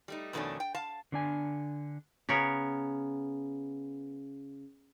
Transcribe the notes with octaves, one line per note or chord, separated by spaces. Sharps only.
G3 A3 D#4
F2 B2 D#3 A3 C#4 D4
G5
F5 A5
D3 D4 G#5
C#3 B3 A#4 C#5